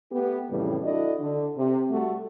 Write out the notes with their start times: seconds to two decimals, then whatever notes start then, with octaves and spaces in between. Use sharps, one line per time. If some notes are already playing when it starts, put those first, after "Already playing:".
0.12 A3 B3 G4
0.50 F2 A2 C#3 E3 G3
0.84 D4 E4 F#4 A4 D5 D#5
1.20 D3
1.57 C3
1.91 G3 A3 F#4